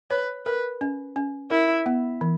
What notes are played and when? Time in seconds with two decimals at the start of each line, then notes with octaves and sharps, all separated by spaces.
0.10 B4 C#5
0.46 A#4 B4
0.81 C#4
1.16 C#4
1.51 E4 A#4
1.86 B3
2.21 E3